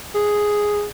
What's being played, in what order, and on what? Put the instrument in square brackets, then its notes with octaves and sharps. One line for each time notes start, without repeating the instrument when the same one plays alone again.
[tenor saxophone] G#4